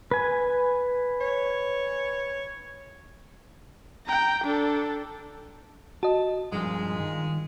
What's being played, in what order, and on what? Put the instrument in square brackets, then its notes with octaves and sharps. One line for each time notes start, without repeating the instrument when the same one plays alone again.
[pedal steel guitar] B4 G#5
[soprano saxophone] C#5
[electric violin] G5 A#5
D4 A4
[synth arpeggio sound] F#4 D#5 [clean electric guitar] A5
[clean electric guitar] G2 F3 F4 [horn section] A#2 G#3
[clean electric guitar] D#3